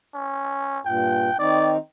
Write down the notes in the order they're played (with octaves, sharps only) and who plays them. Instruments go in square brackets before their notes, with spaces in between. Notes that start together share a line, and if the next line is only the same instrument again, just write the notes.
[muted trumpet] C#4
[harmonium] G2 A#2 [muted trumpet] G5
[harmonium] D#3 C4 D#4 [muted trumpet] D5